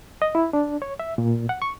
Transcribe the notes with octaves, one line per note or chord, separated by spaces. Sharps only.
D#5
E4
D4
C#5
E5
A#2
F#5
C#6